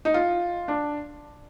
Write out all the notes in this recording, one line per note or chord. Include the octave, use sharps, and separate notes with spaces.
D#4
F4
D4